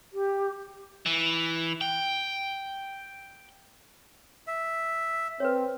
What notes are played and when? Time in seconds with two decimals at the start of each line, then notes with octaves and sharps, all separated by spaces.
0.13 G4
1.06 E3
1.81 G5
4.47 E5
5.40 C4 B4 C#5